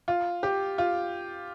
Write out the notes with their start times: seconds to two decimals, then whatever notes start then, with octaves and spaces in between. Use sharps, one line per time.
0.08 F4
0.43 G4
0.78 F4